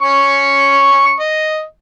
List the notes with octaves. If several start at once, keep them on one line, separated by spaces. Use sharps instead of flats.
C#4 C#6
D#5